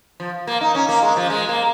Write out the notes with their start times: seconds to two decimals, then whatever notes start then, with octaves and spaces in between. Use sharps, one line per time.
0.20 F3
0.47 A#3
0.61 D#4
0.75 C#4
0.89 A#3
1.03 G#3
1.17 F3
1.30 G#3
1.49 A#3